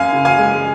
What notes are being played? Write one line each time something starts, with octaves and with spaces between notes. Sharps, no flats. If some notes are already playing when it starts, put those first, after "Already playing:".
Already playing: F#2 F5 G#5
C#3
F5 G#5
G#3